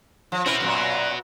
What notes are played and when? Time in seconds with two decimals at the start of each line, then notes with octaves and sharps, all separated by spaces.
0.32 F3
0.46 C4 C#4 E4 F#4 B4
0.60 F#2 A#2 F#3